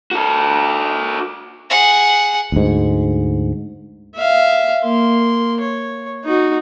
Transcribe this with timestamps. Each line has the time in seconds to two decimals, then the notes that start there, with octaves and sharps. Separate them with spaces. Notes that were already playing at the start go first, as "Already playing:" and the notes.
0.11 F#4 A4
1.70 G#4 F#5
2.52 D2 G#2
4.15 E5 F5
4.84 A#3 C6
5.61 C#5
6.25 D#4 F#4